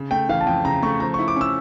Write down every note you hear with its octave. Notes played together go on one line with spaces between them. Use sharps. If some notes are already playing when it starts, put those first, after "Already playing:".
Already playing: C#3
A3 G5
E3 F5
A5
F2 G5
C#3 A#5
A3 C#6
F3 A#5
C#6
E4
D6
C#4 E6